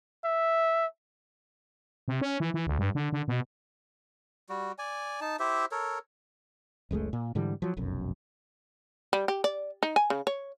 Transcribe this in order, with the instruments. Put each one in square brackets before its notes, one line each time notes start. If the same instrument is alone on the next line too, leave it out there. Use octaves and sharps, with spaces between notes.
[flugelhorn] E5
[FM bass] C3
C#4
E3
E3
D2
G2
D3
D3
B2
[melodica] G3 F#4
D5 G#5
D#4 A5
E4 G4 C5 E5
A4 A#4 C#5
[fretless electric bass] F#1 C#2 G#3 A3
A#2
G#2 D3 E3 G3
F3 F#3
F1 B1 F#2
[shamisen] G3
G4
D5
D#4
G#5
C#3
C#5